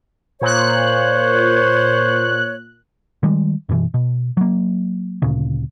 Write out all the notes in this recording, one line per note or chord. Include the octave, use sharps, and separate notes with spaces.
A#2 C5 C#5 F#6
D#3 G3 G#3
F#2 B2 D#3 E3
B2
F#3 A#3
D2 A#2 C#3